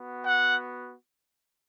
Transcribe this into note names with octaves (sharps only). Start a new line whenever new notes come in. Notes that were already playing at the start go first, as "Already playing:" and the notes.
Already playing: B3 F#4
F#5